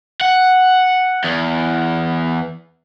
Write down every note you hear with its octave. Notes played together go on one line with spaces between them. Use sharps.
F#5
E2